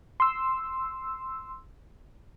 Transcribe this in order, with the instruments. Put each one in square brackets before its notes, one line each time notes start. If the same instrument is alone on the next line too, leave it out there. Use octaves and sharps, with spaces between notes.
[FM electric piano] C6 E6